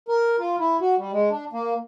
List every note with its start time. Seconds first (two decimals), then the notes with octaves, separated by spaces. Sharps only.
0.08 A#4
0.39 F4
0.59 E4
0.81 F#4
0.98 G3
1.13 G#3
1.30 D4
1.53 A#3